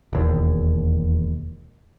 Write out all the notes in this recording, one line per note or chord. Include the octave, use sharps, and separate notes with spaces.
E1 D#2